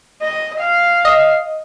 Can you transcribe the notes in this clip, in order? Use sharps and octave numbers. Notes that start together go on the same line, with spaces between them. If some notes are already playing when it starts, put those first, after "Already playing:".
D#5
F5
D#5